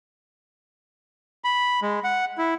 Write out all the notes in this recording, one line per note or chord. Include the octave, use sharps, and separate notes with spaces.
B5
G#3
F#5
E4